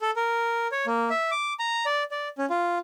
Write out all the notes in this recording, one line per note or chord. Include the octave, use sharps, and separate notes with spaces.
A4
A#4
C#5
A#3
E5
D6
A#5
D5
D5
C#4
F4